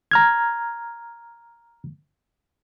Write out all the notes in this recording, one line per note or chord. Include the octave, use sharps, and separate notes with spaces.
A#5 F6 G#6